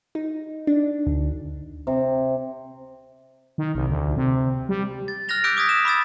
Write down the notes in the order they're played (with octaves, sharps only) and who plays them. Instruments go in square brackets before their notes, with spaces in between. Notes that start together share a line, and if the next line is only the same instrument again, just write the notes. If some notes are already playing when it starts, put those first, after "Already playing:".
[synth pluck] D#4
D4
D2
[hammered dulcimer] C3
[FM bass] D#3
C2
D2
C3
G3
[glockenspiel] A6
F6 F#6 A6 A#6 F7 G7
D6 E6 F#6 G6 B6 D7
D6 D#6 G#6 A#6 B6
E7
B5 D6 E6 A6